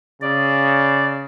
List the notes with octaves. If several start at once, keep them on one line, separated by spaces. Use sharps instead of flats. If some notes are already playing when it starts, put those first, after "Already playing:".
C#3 D5